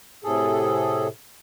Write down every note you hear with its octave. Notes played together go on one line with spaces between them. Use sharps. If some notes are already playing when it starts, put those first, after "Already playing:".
A2 C3 G#4 A4